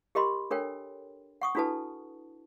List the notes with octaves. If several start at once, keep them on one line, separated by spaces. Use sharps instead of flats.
G4 A#4 D#5 B5 C6
D4 A4 A#4 C#5 G5
F#5 C#6 D#6
D4 E4 F#4 A4 B4 A5